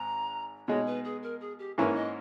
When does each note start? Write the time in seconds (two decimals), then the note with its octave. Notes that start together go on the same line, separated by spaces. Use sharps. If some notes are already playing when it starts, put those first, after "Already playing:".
Already playing: G#1 G#2 A#5
0.68 B2 G#3 D#4 C#5
0.87 B4
1.04 G#4
1.23 A#4
1.41 G#4
1.59 G4
1.78 G#2 E3 A#3 C#4 E4 B4
1.95 D#5